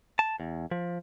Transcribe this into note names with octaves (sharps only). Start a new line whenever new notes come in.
A5
E2
F3